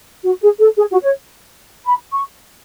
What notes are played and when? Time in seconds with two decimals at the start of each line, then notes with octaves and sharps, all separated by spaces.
0.24 F#4
0.41 G#4
0.60 A4
0.77 G#4
0.91 F#4
1.04 C#5
1.85 B5
2.12 C#6